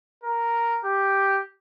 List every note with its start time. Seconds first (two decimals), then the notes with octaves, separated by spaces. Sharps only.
0.24 A#4
0.84 G4